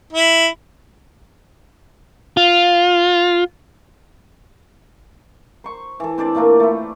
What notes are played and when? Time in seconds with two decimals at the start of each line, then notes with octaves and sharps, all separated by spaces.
0.12 E4
2.37 F4
5.64 C5 C#6
6.00 E3 A4
6.18 C4 D4 A4 D5
6.35 A#2 A3 A#3 D4
6.60 A3 E4